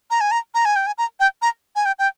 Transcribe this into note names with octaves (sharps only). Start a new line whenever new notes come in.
A#5
G#5
A#5
A#5
G#5
G5
G#5
A#5
G5
A#5
G#5
G5
G5